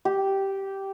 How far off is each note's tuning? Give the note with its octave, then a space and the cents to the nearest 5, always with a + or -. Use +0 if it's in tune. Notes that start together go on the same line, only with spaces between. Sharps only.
G4 -10